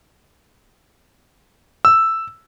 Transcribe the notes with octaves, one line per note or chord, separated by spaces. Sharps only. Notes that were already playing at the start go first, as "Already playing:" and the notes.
E6